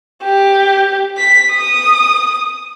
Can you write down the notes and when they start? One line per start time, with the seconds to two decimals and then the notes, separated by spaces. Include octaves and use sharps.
0.24 G4
1.18 B6
1.52 D#6